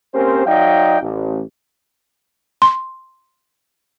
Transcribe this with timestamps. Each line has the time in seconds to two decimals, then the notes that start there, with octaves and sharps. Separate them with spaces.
0.14 A#3 C4 C#4 G4 A#4 C5
0.46 F#3 D#4 D5 D#5 F5 G5
1.01 A1
2.62 C6